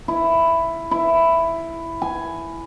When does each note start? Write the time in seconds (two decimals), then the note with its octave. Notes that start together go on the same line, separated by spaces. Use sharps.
0.08 E4
0.91 E4
2.02 G#5